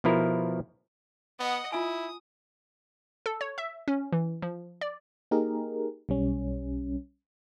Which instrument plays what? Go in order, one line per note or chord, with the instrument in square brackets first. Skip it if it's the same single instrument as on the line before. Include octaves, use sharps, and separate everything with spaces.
[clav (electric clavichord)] B2 F3 E4 A#4
[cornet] B3 [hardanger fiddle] D#5 F#5
[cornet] E4 [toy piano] F4 G#5 [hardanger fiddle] D#6
[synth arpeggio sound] A4
C#5
E5
C#4
E3
F3
D5
[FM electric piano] A#3 D#4 G4 G#4 A#4
B1 G3 C#4